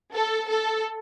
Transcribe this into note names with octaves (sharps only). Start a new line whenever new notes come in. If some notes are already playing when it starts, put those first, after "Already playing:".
A4
A4